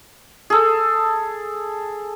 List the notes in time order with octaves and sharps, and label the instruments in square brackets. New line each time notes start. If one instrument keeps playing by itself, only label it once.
[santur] G#4 A4